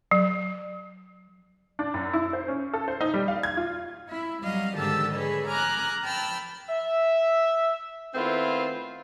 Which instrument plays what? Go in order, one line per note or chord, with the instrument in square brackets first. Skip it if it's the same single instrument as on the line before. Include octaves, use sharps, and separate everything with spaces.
[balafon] F#3
[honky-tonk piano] D4
F#2
E4
C5
C#4
A4
C5
D#4
G3
F5
G#6
F4
[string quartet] E4
F#3 G3 D#5 F5
G#2 D3 D#3 G4 A5 E6
G#4 B4 C#5 D#5
G#5 A#5 D6 F6 F#6 A#6
G5 A5 B5 E6 F6
[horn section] E5
D#3 A3 B3 C4 E4 F4